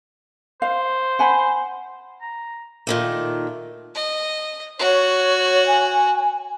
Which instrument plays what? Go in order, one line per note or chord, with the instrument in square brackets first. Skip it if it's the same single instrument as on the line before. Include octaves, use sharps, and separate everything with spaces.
[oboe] C5 [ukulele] F5
[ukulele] F#5 G#5 B5
[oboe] A#5
[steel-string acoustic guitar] A#2 D#3 A3
[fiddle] D#5
[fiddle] F#4 [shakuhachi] C#5
[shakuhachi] G#5